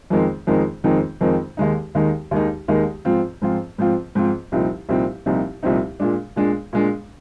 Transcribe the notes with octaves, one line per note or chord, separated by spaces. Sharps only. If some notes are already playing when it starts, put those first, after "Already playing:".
F2 D#3 G#3 C4 D#4
F2 D#3 G#3 C4 D#4
F2 D#3 G#3 C4 D#4
F2 D#3 G#3 C4 D#4
D#2 D#3 G#3 D#4
D#2 D#3 G#3 D#4
D#2 D#3 G#3 D#4
D#2 D#3 G#3 D#4
G#2 F3 C4 F4
G#2 F3 C4 F4
G#2 F3 C4 F4
G#2 F3 C4 F4
C2 A#2 F3 C4 D#4
C2 A#2 F3 C4 D#4
C2 A#2 F3 C4 D#4
C2 A#2 F3 C4 D#4
A#2 G#3 D4
A#2 G#3 D4
A#2 G#3 D4